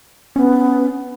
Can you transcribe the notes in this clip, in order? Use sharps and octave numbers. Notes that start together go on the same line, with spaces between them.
B3 C#4